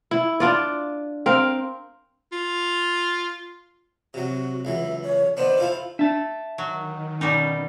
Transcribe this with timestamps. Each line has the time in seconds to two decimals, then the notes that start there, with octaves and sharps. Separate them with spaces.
0.11 E4
0.40 D4 F4 D5
1.26 C4 A#4 F5
2.32 F4
4.14 C3 F#3 F#4
4.65 C#2 E3 F#3 E5
5.03 C#5
5.37 D#3 B3 D4 C5
5.58 E4 F4 A4
5.99 D4 E5 A5
6.58 D#3 F#3
7.21 B2 G3 C#4 D#4